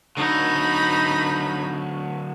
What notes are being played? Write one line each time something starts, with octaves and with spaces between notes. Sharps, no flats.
D3 F#3 D#4 B5